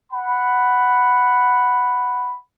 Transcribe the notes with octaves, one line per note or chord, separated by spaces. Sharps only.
F#5 B5